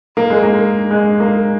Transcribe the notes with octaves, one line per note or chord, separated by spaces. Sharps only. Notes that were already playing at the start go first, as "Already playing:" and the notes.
A#3
G#3
A#3
G#3
A#3